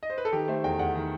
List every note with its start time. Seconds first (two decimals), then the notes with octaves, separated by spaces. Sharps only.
0.03 D#5
0.10 C5
0.18 B4
0.25 A4
0.32 D#3 G4
0.48 A3 C5
0.64 E2 G5
0.79 E2 F#5
0.96 D#3